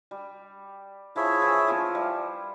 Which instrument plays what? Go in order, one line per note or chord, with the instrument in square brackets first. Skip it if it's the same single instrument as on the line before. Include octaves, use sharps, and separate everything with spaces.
[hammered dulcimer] G3
[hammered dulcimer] F3 [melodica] E4 G#4 C#5 E5
[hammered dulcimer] E3
F3
G3